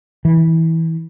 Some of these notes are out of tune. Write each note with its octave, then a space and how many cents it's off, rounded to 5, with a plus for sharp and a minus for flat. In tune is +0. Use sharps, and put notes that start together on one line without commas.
E3 -20